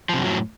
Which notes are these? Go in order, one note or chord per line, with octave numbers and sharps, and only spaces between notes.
F#2 A2 C3 F3 F#3